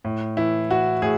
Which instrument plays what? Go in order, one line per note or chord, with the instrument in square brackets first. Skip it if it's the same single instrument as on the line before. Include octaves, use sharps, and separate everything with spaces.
[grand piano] A2
E3 E4
E3 F#4
A2 G#4